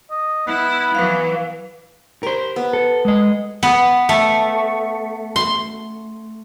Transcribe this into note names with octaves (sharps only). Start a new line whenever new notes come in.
D#5
B3 E4
E3 F#3 B4 F5
G4 A#4 C5
B3
A4
G#3 D#5
B3
A3
C6